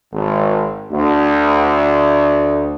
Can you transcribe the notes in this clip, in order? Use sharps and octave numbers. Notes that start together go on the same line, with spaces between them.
G#1
D2